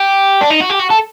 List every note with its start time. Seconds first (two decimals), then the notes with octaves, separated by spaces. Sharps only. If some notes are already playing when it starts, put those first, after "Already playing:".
Already playing: G4
0.41 D4
0.50 D#4
0.60 F#4
0.70 G4
0.79 F#4
0.90 A4